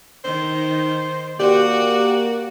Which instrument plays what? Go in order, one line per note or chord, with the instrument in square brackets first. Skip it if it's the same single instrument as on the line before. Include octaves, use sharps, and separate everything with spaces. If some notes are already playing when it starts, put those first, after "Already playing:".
[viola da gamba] D#3 D#4 [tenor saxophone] C5
[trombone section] A#3 [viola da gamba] F#4 [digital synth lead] G4 [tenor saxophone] D5